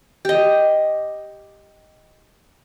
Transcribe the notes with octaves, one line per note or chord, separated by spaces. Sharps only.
G4 D#5